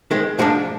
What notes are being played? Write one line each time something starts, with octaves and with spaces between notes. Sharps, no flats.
D#3 G#3 C4
G#2 F3 G#3 D4